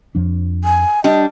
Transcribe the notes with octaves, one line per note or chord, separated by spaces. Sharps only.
F2 F3 D4
G#5
G3 D4 D#5